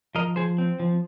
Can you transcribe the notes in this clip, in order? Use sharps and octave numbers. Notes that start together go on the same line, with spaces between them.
F3 A#4 D#5
F3 G#4 C5
C4
F3